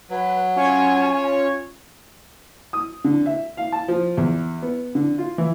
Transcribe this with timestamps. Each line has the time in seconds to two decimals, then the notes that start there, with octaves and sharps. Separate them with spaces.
0.10 F#3 B4
0.56 C#4 F4 C#5 G#5
2.73 D#6
3.05 D3
3.26 E5
3.57 F5
3.72 A5
3.88 F3
4.17 E2
4.62 B3
4.95 D3
5.18 F4
5.38 E3